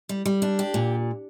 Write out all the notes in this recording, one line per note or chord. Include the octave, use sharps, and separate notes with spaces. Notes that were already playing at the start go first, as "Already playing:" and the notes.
G3
G3
D4
G4
A#2